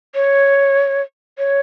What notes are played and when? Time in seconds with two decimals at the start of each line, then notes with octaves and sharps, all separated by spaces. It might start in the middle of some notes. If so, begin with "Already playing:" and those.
0.15 C#5
1.38 C#5